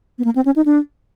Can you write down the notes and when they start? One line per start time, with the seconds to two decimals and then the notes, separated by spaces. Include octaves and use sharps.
0.18 B3
0.24 A#3
0.35 C4
0.45 C#4
0.56 D#4
0.66 D4